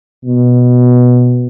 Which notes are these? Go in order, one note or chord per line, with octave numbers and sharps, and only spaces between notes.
B2